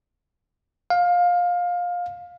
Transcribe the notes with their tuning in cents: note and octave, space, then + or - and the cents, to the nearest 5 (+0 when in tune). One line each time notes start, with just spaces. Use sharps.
F5 +20